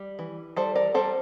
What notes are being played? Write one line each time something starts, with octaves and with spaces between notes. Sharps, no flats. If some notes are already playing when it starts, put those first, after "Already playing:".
Already playing: G3
E3
G3 A4 C5
A#4 D5
G3 A4 C5